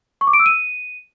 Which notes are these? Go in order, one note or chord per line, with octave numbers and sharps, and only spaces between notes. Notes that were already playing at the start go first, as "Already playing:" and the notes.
C#6
D6
D7
E6
D#7